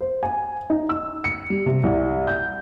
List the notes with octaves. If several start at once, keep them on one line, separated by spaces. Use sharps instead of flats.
C5
G#5
D#4
E6
C#7
G3
C3
C2
G6